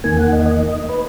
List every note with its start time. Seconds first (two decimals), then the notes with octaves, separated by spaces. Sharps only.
0.04 E2 D#3 A#3 G#5
0.19 F#5
0.33 D#5
0.46 D#5
0.89 B4